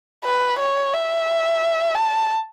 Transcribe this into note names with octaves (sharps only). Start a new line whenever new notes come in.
B4
C#5
E5
A5